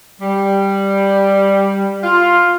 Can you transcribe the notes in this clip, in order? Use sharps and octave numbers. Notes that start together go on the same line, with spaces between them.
G3
F4